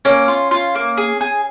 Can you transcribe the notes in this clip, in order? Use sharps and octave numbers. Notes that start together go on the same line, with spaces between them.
A#3 C#4
F4
F4
A#3
G#4
G#4